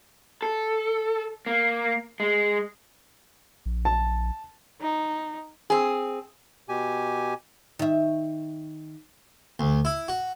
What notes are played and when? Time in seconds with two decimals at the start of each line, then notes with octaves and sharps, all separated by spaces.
0.42 A4
1.46 A#3
2.20 G#3
3.66 A#1
3.85 A5
4.81 D#4
5.70 C4 G#4
6.69 B2 G4 G#5
7.79 D#3 E5
9.59 D2
9.85 E4
10.08 F#4